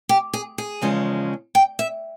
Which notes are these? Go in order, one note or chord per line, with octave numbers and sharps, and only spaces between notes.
G4
G#4
G#4
E2 C#3 F3 G#3 C#4
G5
E5